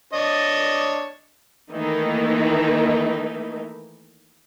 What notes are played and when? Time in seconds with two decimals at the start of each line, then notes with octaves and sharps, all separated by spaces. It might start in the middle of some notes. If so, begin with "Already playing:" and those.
0.13 D4 C#5 D#5
1.71 D#3 E3 A3 A#3 D#4 E4